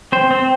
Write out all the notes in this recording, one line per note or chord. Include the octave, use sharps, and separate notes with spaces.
C4 C5
C4